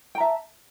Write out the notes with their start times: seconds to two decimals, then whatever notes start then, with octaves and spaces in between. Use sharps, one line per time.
0.15 G5
0.18 A#5
0.20 E5
0.23 A5